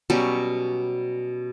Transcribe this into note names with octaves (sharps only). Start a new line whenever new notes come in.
B2 F#3 G3 C#4